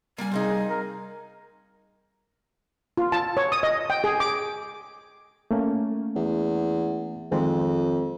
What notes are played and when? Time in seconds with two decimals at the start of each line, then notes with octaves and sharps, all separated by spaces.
0.18 G3 A#3 G#5
0.32 C3 A#3 D#4 G#4
0.69 A#4
2.97 F4
3.12 A5
3.37 C#5
3.52 D#6
3.63 D#5
3.90 G5
4.04 G#4
4.20 D6
5.51 A3 A#3 C#4
6.16 E2
7.32 F2 D#3 G#3 C4